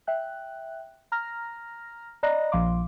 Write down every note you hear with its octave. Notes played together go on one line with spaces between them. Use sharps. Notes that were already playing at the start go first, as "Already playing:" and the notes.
E5 G5 F#6
A#5 F6 A#6
D5 D#5 A#5 B5 F#6 A#6
A#1 F3 F5 C6 D6